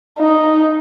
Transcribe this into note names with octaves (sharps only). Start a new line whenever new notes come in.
D#4